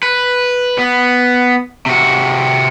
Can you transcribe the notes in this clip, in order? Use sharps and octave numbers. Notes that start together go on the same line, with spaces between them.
B4
B3
C3 F#4